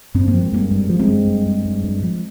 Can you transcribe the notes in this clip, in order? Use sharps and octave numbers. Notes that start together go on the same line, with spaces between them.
G2 C4
A#3
F3
G#3
G2 G3 A#3
G2 G#3
F3
G#3 C4
G2
G2
G2
G2
G2
F3